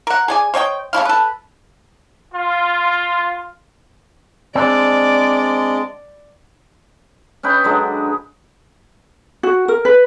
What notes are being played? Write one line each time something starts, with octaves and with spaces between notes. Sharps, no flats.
A#4 F#5
G#4 D5 G#5
C5 C#5 D#5 G5
C#3 A3 E4 F5
A4 B4
F4
G#3 C4 D4 D5
C#4 D#4 B4 G5
D3 F#3 G#3
F#4
A#4
B4